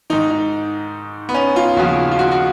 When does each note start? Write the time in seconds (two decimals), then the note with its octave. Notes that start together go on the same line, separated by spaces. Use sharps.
0.10 G#2 D#3 D#4
0.31 D#4
1.29 B3
1.34 C#4
1.56 F4
1.76 D#2 C#3 F3 F#4
2.11 F4
2.19 F#4
2.32 F#4